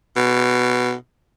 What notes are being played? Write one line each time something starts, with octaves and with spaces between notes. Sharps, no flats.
B2